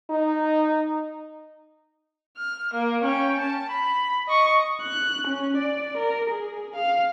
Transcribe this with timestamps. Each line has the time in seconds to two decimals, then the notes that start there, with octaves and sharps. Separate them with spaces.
0.10 D#4
2.37 F6
2.73 A#3
3.04 C#4 G5
3.39 A5
3.70 B5
4.28 D#5 C#6
4.82 F#6
5.27 C#4
5.57 D5
5.97 A#4
6.30 G#4
6.75 F5